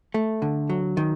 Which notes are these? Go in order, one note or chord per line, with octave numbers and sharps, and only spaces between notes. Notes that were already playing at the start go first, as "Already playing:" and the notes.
A3
D3
F#3
D#3